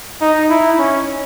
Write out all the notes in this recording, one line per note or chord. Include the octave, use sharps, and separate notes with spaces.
D#4
E4
C#4